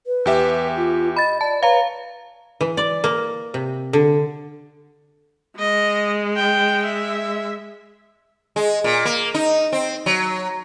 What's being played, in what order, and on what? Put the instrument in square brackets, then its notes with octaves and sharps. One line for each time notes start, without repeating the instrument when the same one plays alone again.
[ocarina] B4
[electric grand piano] E2 G4 E5
[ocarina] F4
[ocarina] D#5 [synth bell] B5 A6
[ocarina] D5 [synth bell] A5
[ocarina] B4 [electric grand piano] C#5 [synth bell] F5 A#5
[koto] E3
D5
A#3
C3
D3
[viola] G#3 [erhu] D#5
[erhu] G5
E5
[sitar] G#3
A#2
A#3
D#4
C4
F#3